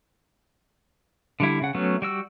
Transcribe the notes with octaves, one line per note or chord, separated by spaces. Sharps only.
D3 G3 E4
C#3 F#5
F#3 A3 B3 C#4
G3 F#4 E6